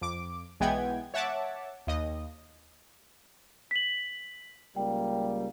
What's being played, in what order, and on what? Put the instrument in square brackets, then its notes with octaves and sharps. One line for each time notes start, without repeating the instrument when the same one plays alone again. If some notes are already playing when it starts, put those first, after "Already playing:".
[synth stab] F2 D6
B1 E3 G#3 B3 G5 G#6
C#5 E5 F#5 A5 D6
D#2 D#5
[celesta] B6 F#7
[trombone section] C#2 G3 A#3 [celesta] G5